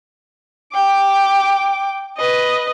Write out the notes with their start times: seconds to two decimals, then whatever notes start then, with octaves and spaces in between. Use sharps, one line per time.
0.73 G5 D6
2.17 B4 D#5